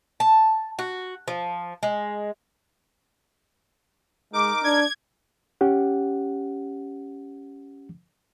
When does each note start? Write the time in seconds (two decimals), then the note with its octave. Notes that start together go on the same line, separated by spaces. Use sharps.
0.20 A5
0.79 F#4
1.28 F3
1.83 G#3
4.33 G#3 D#4 A#4 D6
4.64 D4 G#6
5.61 C#4 G4 F#5